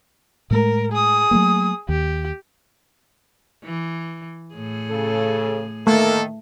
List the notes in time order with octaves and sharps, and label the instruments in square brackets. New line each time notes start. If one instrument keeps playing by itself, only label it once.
[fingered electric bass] A2 G#3 A3 [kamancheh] A#4
[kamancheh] G#4 D#6
[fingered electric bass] F#3 A3 A#3
[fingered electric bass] D#2 [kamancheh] G4
[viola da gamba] E3
A2 G#4
[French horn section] C#3 A4
[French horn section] D#3 [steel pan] A3 [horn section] A#3 A4